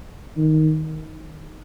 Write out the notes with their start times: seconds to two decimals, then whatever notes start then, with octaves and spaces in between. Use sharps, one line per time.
0.37 D#3